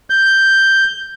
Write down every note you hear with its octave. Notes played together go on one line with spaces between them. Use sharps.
G6